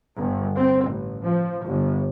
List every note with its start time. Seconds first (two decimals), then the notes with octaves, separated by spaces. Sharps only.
0.18 G1
0.57 C4
0.88 A1
1.25 F3
1.66 G1